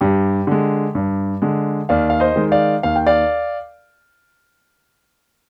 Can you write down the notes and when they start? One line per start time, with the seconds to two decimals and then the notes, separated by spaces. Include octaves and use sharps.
0.01 G2 G4
0.47 D3 G#3
0.95 G2
1.42 D3 G#3
1.89 D#2 D5 F5
2.10 F5
2.20 C5 D#5
2.36 D#3 G#3
2.52 D5 F5
2.83 D#2 F5
2.96 G5
3.07 D5 F5